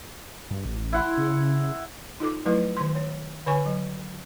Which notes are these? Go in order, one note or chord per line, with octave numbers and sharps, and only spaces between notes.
G2
A1
E4 F#5 C6
C#3
D#4 F4 A4 D6
F3 F#3 A3 E4 B4
D#3 C6
C#5
D3 B4 C#5 G#5 C#6
F#3